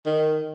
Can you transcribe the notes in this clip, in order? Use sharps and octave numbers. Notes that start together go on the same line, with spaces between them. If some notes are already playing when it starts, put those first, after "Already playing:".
D#3